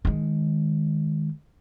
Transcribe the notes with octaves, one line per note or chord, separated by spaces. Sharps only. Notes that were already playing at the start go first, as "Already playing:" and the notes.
D#3 G#3